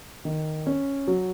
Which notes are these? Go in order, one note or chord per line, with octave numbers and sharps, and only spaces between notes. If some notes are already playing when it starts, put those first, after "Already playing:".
D#3
C#4
F#3